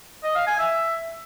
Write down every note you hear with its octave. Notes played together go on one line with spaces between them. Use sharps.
D#5
F5
G#5
E5